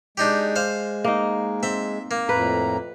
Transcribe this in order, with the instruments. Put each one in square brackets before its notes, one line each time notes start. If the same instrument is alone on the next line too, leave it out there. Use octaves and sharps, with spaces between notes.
[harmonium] G#3 [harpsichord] D4 D#4 G4
[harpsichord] C5 F5
[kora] A#3 D#4
[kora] C4 [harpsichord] E5
[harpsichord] A#3
[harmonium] F2 A2 A#5 [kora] B4